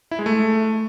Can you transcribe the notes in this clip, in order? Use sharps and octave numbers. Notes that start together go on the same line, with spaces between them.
E4
G#3
A3